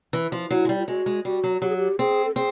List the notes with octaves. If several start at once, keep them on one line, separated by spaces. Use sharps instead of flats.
E3
F3
F#3 E4
G#3
G3
F4
G#3 F#4
G#3
G3 F#4
F#3
F#3 G4
G#4
G4
C4 G#4
A4
C4 G#4